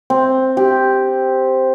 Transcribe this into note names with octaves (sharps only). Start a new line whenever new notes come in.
C4
G4